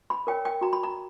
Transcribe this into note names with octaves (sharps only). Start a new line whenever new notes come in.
B5
A#4 C#5 G5
G5
F#4 A#5
B5
A#5